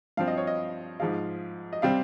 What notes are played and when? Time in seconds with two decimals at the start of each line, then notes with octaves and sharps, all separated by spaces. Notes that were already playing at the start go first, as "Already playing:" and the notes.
0.17 G2 F3 C4 F5
0.28 D#5
0.37 C#5
0.47 D#5
1.00 G#2 F3 G#3 F5
1.73 D#5
1.82 C3 G3 C4 F5